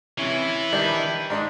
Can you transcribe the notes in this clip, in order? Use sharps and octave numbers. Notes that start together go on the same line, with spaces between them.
C3 E3 C#4 E4
D#3 G3 D4
G#2 D4 D#4